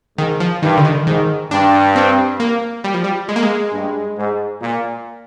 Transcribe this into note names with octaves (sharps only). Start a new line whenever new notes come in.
G#2 D#3
F3
G2 D#3
D3
D#3
G#2 D#3
G2 D4
C4
A#3
G3
F3
G3
G#3
A#3
G#3
G2
G#2
A#2